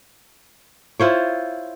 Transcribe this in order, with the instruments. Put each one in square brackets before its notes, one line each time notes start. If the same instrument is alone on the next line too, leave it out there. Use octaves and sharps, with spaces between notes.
[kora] E4 F4 C5 C#5